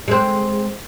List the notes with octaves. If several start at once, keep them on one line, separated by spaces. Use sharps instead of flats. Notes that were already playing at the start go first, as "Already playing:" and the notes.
G#3 C4